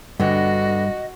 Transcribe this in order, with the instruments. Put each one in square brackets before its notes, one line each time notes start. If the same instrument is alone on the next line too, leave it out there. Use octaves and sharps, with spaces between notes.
[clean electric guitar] G2 [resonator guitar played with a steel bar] D3 B3 [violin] F#4 [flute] D#5